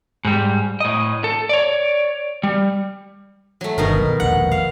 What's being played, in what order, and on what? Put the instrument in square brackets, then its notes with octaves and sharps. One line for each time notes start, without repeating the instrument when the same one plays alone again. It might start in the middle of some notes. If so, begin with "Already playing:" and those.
[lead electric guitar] G#2 G3
A2 D#5
A4
C#5 D5
G3
[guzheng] F#3 A3
[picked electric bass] G1 [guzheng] B2 D#3 A#4
[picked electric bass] B1
[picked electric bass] E1 A#1 [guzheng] F#5
[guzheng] F5